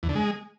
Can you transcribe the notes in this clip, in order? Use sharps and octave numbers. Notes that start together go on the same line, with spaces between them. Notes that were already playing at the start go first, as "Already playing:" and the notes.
E2
D3
G#3